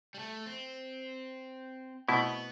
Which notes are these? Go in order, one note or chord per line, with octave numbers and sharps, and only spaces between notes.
G3
A3
C4
B2 A3 B3 C4 E4